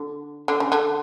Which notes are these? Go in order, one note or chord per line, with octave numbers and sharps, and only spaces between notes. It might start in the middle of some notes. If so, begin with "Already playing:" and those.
Already playing: D3
D3
C#3
D3